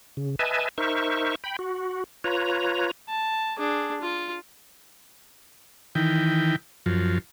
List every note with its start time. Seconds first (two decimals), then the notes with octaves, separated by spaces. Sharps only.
0.17 C#3
0.39 B4 D#5 E5 G#5 A5
0.78 D#4 A#4 C5 E5 C#6
1.44 G5 B5
1.59 F#4
2.24 F4 B4 C#5 A#5
3.09 A5
3.58 D4 G#4
4.01 F4
5.95 D#3 E3 G5
6.86 F#2 F3